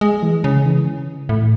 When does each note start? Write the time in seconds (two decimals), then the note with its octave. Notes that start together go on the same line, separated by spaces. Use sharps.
0.01 G#3
0.23 E3
0.44 C#3
0.66 E3
1.29 A2